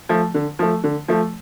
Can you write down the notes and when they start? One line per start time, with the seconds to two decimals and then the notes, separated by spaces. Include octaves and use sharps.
0.09 F3 A3
0.34 D3
0.59 F3 A3
0.84 D3
1.08 F3 A3